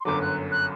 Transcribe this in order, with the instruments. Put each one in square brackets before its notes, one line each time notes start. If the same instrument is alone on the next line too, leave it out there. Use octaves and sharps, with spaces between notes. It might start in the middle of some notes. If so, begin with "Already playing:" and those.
[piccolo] C6
[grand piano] G1 F#2 D3 F#3 [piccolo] D6
[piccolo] F#6
F#6